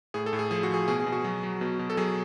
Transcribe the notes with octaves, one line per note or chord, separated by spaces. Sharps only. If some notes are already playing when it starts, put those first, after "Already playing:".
A2 G#4
A4
A2
G#4
F3 G#4
F#4
F3 G#4
B2 G#4
G#4
B2
F#4
F#3
F#3
B2
B2
A4
F#3 G#4